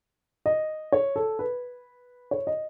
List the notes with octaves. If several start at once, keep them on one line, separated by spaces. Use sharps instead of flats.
D#5
C#5
A4
B4
C#5
D#5